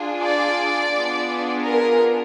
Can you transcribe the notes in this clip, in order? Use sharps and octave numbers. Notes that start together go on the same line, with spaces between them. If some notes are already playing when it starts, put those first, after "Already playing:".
Already playing: D4 F4 G#4
D5
B3 D4 F4 G#4
A#4